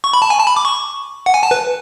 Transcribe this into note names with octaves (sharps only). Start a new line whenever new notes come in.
C#6
B5
A5
G#5
A5
B5
D6
C#6
F#5
G#5
A5
B4